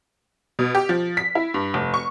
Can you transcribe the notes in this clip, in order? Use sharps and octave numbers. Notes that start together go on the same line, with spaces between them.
B2
G4
F3
B6
E4
G2
F1
C#6